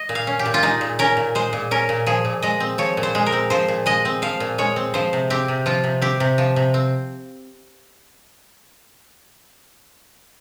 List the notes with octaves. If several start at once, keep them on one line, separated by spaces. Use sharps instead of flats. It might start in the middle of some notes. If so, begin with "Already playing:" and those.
Already playing: D#5
A#2
F5
C#4
G4
A#2
F4
G#3 D#4
A#2
C#4 A#4
A#2
G#3 C5
A#2
C#4 A#4
A#2
F3 G#4
A#2
G#3 D#5
C4
F3 C#5
A#2
C5
G#3
A#4
C4
F3 C5
A#2
G#3 D#5
C4
F3 F5
A#2
G#3 C#5
C4
F3 C5
C3
C4 G4
C3
F3 F4
C3
C4 G4
C3
F3
C3
C4